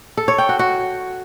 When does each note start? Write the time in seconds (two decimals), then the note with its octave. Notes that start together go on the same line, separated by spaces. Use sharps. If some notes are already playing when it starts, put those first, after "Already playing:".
0.17 A4
0.28 C#5
0.38 G5
0.49 F#4
0.59 F#4